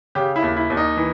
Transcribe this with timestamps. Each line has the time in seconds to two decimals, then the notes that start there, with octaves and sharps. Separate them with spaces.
0.15 C#3 G4
0.36 E4
0.42 D#2
0.57 E4
0.70 D#2
0.77 D#4
0.97 E3